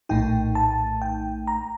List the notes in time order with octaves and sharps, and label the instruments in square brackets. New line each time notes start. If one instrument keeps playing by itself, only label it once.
[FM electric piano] A#1 A2 A3 D#4 G5
A5
G5
A#5